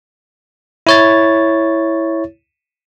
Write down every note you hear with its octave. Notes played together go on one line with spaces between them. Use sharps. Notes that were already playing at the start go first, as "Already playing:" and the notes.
E4 C#5 A6